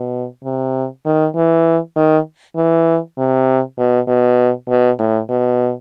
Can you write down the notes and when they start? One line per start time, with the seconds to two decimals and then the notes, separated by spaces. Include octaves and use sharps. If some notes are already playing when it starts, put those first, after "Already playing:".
Already playing: B2
0.44 C3
1.06 D#3
1.35 E3
1.96 D#3
2.56 E3
3.18 C3
3.78 B2
4.08 B2
4.69 B2
4.99 A2
5.29 B2